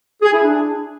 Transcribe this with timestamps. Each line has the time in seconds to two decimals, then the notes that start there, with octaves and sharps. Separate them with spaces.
0.22 G#4
0.32 E4
0.43 D4